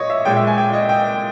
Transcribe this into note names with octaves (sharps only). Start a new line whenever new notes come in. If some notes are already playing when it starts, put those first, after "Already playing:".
Already playing: A#2 C#5 D#5
E5
A#2 G#3 G5
E5
G#5
G5
D#5
G5